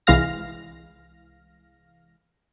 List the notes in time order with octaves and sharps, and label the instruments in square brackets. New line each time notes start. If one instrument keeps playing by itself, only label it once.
[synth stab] C2 E3 G#3 F5 F6 A#6